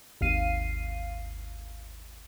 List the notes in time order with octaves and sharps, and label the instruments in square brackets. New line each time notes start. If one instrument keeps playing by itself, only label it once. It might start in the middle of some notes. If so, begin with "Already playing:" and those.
[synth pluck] G#1 D#2 F5 C7 D#7